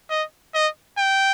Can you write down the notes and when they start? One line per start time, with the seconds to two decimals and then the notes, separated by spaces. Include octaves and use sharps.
0.10 D#5
0.55 D#5
0.99 G5